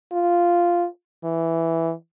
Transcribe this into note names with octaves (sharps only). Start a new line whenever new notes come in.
F4
E3